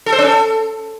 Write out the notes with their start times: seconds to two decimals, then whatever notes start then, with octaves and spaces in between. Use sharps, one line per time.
0.06 A4
0.12 C5
0.19 C#4
0.25 A4